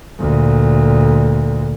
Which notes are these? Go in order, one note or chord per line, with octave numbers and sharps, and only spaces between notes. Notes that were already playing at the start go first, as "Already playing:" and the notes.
D2 A#2